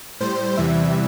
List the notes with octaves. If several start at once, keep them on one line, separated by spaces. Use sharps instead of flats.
A2 G3 C5
E2 C3 E3 G3 E5